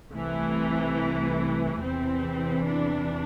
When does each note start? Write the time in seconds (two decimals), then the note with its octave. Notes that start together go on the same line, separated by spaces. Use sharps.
0.11 C2 C3 E3 A3
1.81 E2 C3 E3 C4
2.66 D4